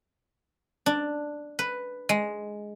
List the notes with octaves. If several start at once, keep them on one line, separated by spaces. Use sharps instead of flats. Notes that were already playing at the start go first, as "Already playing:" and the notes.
D4
B4
G#3